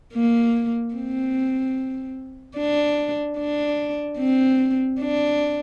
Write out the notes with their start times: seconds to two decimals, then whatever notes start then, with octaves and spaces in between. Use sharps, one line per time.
0.13 A#3
0.95 C4
2.57 D4
3.38 D4
4.19 C4
5.00 D4